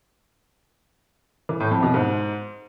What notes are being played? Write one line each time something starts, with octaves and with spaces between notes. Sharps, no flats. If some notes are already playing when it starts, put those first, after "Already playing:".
E3
A2
F2
B2
G#2